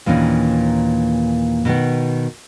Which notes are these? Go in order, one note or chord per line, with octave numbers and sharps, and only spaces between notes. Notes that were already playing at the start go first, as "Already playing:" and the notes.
D#2 A#2 E3 C#4 D4
B2 D#3 B3